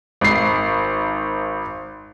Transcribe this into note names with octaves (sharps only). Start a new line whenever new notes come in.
G#1 C7